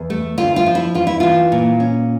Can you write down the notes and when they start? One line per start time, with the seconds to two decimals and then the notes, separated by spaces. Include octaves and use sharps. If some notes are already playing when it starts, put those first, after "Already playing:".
Already playing: E2
0.10 A3
0.38 D2 F4
0.56 F4
0.66 F3
0.75 E4
0.94 E2 F4
1.07 E4
1.20 E3 F4
1.52 A#2
1.80 C#4